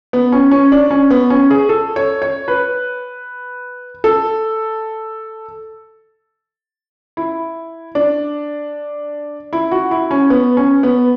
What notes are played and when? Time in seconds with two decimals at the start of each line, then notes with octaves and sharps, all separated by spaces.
0.13 B3
0.32 C#4
0.51 C#4
0.72 D4
0.91 C#4
1.10 B3
1.30 C#4
1.50 G#4
1.69 A4
1.96 C#5
2.22 C#5
2.48 B4
4.04 A4
7.17 E4
7.95 D4
9.53 E4
9.71 F#4
9.91 E4
10.11 C#4
10.30 B3
10.57 C#4
10.83 B3